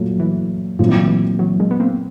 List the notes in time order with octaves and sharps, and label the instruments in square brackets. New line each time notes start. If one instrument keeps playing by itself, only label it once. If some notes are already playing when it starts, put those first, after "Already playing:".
Already playing: [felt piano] A#2 F#3 A3
[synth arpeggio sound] E3
[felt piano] A#2 F#3 A3 C4 [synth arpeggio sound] F3
[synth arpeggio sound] E3
D#3
E3
E3 F#3
G#3 A#3
B3
A#3 C4